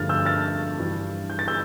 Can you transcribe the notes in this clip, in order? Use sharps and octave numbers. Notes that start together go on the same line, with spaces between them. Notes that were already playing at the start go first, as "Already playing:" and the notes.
Already playing: G2 D3 F3 A3 F6 A6
E6 G6
F6 A6
G2 E3 G3
G6
A6
E6 G6